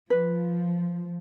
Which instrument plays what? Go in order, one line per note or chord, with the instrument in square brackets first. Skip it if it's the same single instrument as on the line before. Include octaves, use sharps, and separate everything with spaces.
[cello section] F3 [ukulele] B4